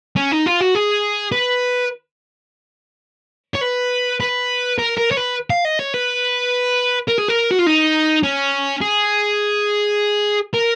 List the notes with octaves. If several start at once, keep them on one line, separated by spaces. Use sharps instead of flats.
C#4
D#4
F4
F#4
G#4
B4
C#5
B4
B4
A#4
A#4
C#5
B4
F5
D#5
C#5
B4
A#4
G#4
A#4
F#4
F4
D#4
C#4
G#4
A#4